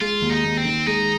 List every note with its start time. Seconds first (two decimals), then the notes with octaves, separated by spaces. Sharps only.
0.01 G#3 F4
0.22 D#2
0.30 D#4
0.44 D#2
0.57 C4
0.65 D#3
0.86 G#3 D#4